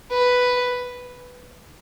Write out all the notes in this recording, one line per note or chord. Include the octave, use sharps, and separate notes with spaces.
B4